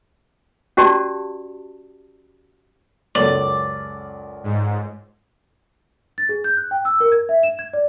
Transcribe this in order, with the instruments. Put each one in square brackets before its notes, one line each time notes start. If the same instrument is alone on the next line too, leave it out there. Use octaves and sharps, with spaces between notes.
[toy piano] C#4 F#4 G4 D5 A5
[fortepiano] C#2 F#2 A4 [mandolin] D5
[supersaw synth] G#2
[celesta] A6
G#4
G6
F#6
G5
E6
A#4
G#6
E5
E7
G#6
D5